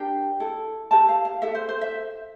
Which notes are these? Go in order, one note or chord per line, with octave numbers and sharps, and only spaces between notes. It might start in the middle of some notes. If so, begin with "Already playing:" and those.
Already playing: D4 G4 A#4 G5
E4 A4
E4 G4 A#4 A5
F5
F5
E4 A4 E5
C5
C5
E5